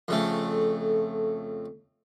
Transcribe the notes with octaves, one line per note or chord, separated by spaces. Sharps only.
F2 C#3 A3